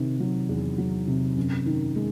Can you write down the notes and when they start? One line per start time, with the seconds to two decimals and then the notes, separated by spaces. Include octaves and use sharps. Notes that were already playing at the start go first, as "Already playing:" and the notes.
Already playing: C3 D#3
0.20 F#3
0.49 E2
0.78 F#3
1.08 C3
1.37 F#2
1.66 D#3
1.95 G#3